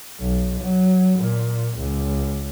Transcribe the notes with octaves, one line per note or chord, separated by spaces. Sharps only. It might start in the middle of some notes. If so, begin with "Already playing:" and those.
B1
F#3
A#2
C#2